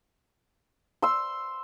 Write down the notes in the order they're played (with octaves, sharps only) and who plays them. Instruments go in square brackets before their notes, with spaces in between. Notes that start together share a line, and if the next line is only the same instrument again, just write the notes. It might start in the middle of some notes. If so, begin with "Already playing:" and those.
[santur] C6 E6